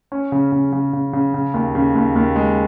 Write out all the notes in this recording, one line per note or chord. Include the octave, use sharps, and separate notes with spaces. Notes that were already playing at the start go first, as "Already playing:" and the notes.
C#4
C#3
C#3
C#3
C#3
C#3
C#3
D#2
C#3
D#2
D#2
G#3